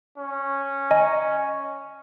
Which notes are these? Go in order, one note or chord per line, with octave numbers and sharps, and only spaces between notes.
C#4
D#5 G#5 A#5